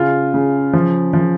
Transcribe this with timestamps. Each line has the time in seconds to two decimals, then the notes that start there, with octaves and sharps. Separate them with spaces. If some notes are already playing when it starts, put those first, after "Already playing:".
Already playing: C#3 F4
0.34 C#3
0.73 F3
1.13 F3